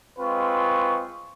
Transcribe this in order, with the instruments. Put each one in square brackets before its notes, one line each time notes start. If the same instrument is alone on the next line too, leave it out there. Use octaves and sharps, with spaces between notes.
[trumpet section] G#3 C4 F4 B4 C#6